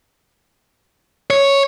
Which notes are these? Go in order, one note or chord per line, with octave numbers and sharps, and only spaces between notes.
C#5